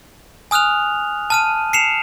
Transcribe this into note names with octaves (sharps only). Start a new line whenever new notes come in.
G#5 D#6 F6 F#6 F7
A5 F6 D#7
C7 C#7 E7 F7